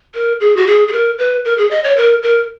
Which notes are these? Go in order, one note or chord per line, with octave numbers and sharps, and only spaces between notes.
A#4
G#4
F#4
G#4
G#4
A#4
B4
A#4
G#4
D#5
C#5
A#4
A#4